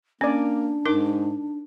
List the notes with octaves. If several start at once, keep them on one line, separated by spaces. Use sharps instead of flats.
A#3 C#4 D4 D5 G#5
G#2 D#4 A#4 D6